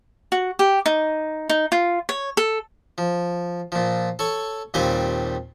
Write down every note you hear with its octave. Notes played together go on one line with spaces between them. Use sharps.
F#4
G4
D#4
D#4
F4
C#5
A4
F3
A#2 F3
A4 C#5 C#6
D#2 A#2 G3 C4 G4 G#5